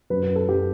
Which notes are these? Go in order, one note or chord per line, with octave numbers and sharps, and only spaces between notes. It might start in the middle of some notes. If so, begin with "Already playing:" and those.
F#2 F#3 B4
B4
A4
F#2 F#3 G4